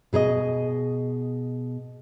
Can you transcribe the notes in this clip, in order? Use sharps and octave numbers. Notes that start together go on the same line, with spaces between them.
B2 G#4 B4 D#5